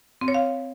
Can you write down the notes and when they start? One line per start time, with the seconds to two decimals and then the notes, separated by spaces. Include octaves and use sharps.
0.21 C4
0.28 C#5
0.34 F5